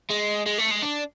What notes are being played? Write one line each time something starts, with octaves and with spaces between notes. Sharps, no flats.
G#3
G#3
A3
G#3
D4